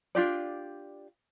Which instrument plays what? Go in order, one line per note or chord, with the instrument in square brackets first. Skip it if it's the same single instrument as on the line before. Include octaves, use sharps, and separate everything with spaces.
[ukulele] D4 F4 G4 D5